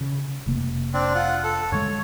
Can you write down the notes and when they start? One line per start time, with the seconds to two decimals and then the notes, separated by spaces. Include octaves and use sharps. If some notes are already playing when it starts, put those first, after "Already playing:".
0.01 C#3
0.46 F1 C3 A#3
0.94 C4 D4
1.15 F4 F#5
1.44 A4
1.72 G2 D3 G#3 C#5